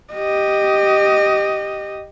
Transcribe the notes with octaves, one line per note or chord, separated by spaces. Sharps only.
G4 D#5